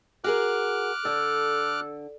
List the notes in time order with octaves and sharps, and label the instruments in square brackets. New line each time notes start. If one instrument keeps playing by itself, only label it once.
[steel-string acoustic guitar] F#4 G#4 A#4 [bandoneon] D6 F6 F#6
[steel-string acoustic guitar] D3 [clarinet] A4